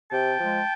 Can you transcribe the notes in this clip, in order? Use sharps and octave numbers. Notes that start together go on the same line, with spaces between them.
C3 G5 A5
F3 G#3